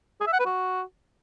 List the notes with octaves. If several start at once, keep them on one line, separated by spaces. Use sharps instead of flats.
G#4
E5
F#5
B4
F#4